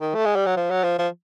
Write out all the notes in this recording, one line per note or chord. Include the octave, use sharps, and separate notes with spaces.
D#3
A3
G#3
G3
F#3
F3
F#3
F3
F3